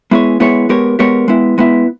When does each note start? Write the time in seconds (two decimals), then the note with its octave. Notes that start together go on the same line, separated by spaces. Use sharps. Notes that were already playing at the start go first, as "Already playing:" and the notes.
0.11 G#3 B3 E4 G#4 C#5
0.40 G#3 B3 E4 G#4 C#5
0.69 G#3 B3 G4 A#4 C#5
0.99 G#3 B3 G4 A#4 C#5
1.28 G#3 B3 E4
1.58 G#3 B3 E4